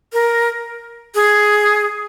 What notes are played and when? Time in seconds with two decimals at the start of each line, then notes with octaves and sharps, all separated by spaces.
0.13 A#4
1.15 G#4